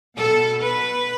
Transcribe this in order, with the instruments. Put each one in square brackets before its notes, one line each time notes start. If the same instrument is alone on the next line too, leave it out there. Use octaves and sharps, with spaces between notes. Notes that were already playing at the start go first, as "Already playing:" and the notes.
[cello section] B2 A4
B4